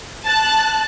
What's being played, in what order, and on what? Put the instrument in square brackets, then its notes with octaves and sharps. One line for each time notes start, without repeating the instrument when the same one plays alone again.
[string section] A5 F#6